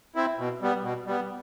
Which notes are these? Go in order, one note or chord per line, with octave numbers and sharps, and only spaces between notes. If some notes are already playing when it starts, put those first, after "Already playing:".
C4 E4
B2
G3 B3
B2
G3 B3